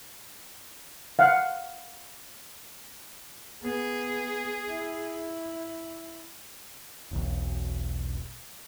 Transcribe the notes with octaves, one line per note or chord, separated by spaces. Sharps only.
F5 F#5
B3 G#4
E4
E1 B1